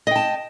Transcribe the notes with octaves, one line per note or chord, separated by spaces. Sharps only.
D#5 G5 A5